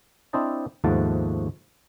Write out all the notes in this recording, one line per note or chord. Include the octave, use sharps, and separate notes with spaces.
C4 D4 E4 C5 D#5 A5
D#2 G#2 F3 A3 F#5 A5